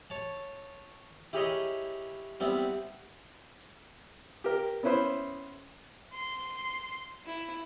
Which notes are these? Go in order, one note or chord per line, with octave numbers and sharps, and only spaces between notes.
C#5 A5
E4 G4 G#4 A#4 C#5 D#5
G3 B3 C4 E4
G4 A#4
B3 C#4 E4 B4 C5
C6
E4